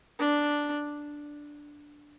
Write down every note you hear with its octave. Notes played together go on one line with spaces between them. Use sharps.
D4